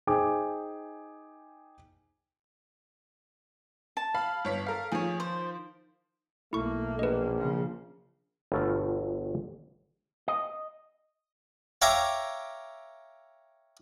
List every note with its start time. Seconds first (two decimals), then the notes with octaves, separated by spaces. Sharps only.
0.07 D#4 G#4 C5 G5 G#5 D6
3.97 A5
4.15 F5 B5
4.45 G1 C#5 B6
4.66 A4 A#4 F5
4.92 D#3 F3 G#4 C#5
5.20 C5
6.53 B1 A3 A#3 E4 C#6
6.99 A#1 B4 D#5
7.38 C#3 F3
8.52 G1 B2 A3 F4 E5 A#5
10.28 D#5
11.82 C#5 E5 F5 G5 A#5 D6